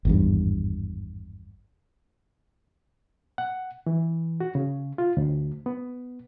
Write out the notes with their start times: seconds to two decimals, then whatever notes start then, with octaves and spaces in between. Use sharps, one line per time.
0.05 G#1 E2 G2
3.38 F#5
3.86 E3
4.40 F#4
4.55 C#3
4.98 F4
5.17 D2
5.66 B3